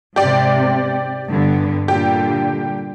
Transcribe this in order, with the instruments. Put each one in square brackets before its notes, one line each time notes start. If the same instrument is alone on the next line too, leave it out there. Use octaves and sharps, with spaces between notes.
[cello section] G#2 C3 [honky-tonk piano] G4 D5
[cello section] G2 D3 B3
[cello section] A#2 D3 G3 [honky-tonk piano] G4